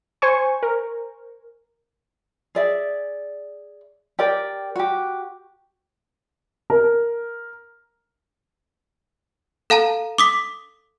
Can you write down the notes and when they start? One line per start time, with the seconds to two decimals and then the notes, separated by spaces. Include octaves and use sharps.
0.22 C5 G#5 C#6
0.63 A#4
2.55 G#4 D5 E5
4.19 G4 A#4 D5 G5
4.76 F#4 G4
6.70 A#4
9.70 A4 F5 A5 A#5
10.18 D6 D#6 B6